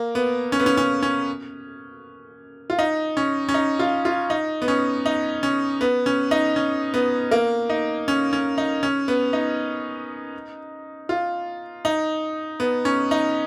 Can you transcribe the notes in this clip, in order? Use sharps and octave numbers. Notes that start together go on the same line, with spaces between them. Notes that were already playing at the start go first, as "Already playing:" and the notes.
Already playing: A#3
B3
C#4
B3
C#4
C#4
C#4
F4
D#4
C#4
C#4
D#4
F4
F4
D#4
B3
C#4
D#4
C#4
B3
C#4
D#4
C#4
B3
A#3
D#4
C#4
C#4
D#4
C#4
B3
D#4
F4
D#4
B3
C#4
D#4